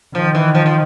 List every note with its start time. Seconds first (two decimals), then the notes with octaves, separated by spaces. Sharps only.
0.15 D#3 F3
0.35 E3
0.55 F3
0.66 F3